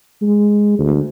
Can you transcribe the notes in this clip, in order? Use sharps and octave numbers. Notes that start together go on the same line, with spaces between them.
G#3
D2